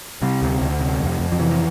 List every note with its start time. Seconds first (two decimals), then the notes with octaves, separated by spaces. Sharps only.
0.22 C3 G3
0.42 D2
0.61 D2
0.80 C3
1.00 F2
1.19 F2
1.32 F3
1.39 C3 E3